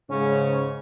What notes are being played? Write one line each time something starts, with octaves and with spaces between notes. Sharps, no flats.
G#2 C#3 C#4